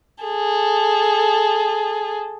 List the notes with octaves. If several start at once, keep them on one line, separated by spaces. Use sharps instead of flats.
G#4 A4